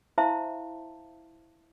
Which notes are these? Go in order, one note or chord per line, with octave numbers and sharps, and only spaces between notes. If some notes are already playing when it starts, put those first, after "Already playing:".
E4 C5 E5 F5 A5 C6